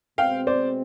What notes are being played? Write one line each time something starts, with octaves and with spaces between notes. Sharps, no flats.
B2 G#3 C4 F5 G5
C5 D5